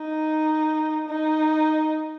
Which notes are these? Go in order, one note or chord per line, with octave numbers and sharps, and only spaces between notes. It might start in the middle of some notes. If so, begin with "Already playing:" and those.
Already playing: D#4
D#4